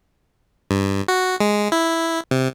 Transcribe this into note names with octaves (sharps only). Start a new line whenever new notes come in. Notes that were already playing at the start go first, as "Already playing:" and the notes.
G2
F#4
G#3
E4
C3